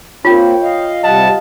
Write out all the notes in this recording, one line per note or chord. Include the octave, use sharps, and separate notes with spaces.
A#3 C4 F4 C#5 G5
D#5 F5
C3 G3 D#5 F5 F#5 A5